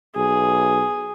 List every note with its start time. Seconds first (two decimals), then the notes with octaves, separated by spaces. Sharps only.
0.16 B1 G#4